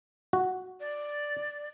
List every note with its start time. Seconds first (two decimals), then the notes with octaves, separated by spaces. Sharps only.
0.33 F#4
0.80 D5